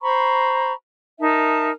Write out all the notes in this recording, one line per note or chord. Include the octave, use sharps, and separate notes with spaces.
C5 A#5 B5 C#6
D#4 A#4 E5 A5